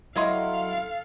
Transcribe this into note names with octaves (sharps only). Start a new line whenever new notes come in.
F#3 E4 A4 C#5 D#5 F5 C6